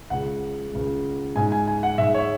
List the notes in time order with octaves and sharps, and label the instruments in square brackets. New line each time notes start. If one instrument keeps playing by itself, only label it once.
[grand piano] C#2 C#3 G#3 F#5
C#2 C#3 G#3
G#2 G#3 G#5
G#5
G#5
F#5
G#2 G#3 E5
C#5